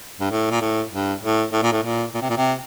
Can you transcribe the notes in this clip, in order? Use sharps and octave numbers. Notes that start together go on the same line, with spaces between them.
G2
A2
A#2
A2
G2
A2
A2
A#2
A2
A#2
A#2
C3
A#2
C3